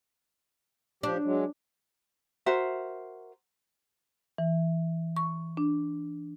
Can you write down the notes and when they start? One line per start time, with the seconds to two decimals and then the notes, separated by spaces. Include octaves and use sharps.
1.03 F3 D4 G4
1.24 F#3 G#3
2.46 F#4 A#4 C5 E5
4.38 E3
5.17 C#6
5.57 D4